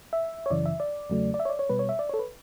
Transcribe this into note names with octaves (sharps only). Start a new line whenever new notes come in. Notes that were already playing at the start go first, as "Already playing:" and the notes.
E5
C#5
F#2 C#3 E3 D5
E5
D5
E2 C#3 F#3 A3
D5
E5
C#5
D5
C#5
B2 G3 B4
C#5
E5
D5
A4 C#5
B4